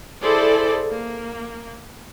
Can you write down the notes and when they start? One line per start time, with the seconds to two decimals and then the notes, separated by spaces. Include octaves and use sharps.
0.21 E4 G#4 A4 C5 D5
0.89 A#3